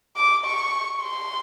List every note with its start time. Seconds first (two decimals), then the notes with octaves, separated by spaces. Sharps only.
0.16 D6
0.44 C#6
1.01 C6